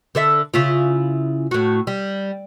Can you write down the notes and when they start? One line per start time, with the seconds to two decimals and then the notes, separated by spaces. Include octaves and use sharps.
0.15 D3 A4 E5
0.54 C#3 E4 F4
1.51 A2 F#4
1.87 G3